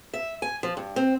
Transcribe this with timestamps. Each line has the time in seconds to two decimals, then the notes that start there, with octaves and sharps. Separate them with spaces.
0.14 E5
0.42 G#5
0.63 F3
0.77 G2
0.96 C4